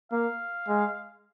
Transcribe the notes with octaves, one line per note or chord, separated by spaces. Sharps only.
A#3 F5
G#3